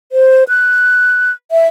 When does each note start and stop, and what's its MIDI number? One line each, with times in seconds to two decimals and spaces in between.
0.12 0.44 72
0.48 1.31 90
1.51 1.68 76